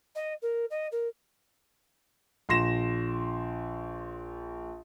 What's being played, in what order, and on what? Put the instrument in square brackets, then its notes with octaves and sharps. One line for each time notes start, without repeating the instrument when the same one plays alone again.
[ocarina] D#5
A#4
D#5
A#4
[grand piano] A#1 C6 A#6 E7